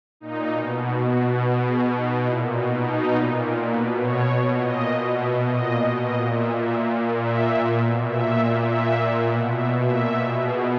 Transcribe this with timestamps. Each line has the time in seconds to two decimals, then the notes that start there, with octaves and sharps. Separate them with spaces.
0.20 A#2 D#4
0.49 B2
0.78 B2 F#4
1.09 B2 F#4
1.38 B2
1.67 B2 G#4
1.95 B2 D#4
2.24 A#2 E4
2.54 B2 D#4
2.84 B2 D#4
3.12 A#2
3.41 A#2 A#4
3.71 B2 B4
4.00 B2 C#5
4.30 B2
4.59 A#2 D#5
4.89 B2
5.17 B2 E5
5.46 A#2 D#5
5.76 B2
6.05 A#2 D#5
6.35 A#2 E5
6.64 A#2 E5
6.93 A#2
7.22 A#2 E5
7.51 A#2
7.80 B2
8.09 A#2 E5
8.39 A#2
8.68 A#2 E5
8.98 A#2
9.26 B2 F#5
9.56 B2 E5
9.85 A#2 E5
10.14 B2
10.43 B2 G#4